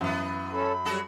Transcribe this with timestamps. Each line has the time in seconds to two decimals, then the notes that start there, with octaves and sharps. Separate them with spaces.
0.01 F#2 E3 B3
0.53 C#4 A4 B5
0.85 F#3 G3 F#4 G#4 A4